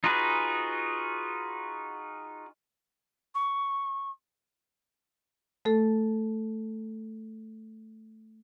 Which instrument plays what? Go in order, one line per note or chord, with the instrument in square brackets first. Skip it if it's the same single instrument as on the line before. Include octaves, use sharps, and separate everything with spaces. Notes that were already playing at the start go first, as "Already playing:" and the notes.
[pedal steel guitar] D#4 F4 F#4 G#4 B4
[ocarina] C#6
[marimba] A3 A4